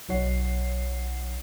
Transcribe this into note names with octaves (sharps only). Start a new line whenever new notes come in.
B1 F#3 D#4 C#5 F#5 C7